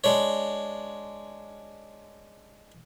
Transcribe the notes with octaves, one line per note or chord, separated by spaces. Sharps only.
G#3 D4 C#5